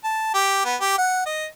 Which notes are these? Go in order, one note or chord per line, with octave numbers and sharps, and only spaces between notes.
A5
G4
B3
G4
F#5
D#5